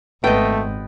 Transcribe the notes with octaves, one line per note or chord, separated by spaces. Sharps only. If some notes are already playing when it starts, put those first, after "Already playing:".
G#1 A3 B3 D#5 G5